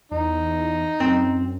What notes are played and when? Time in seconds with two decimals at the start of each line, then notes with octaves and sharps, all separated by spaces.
0.12 E2 D#4
1.00 F#2 C4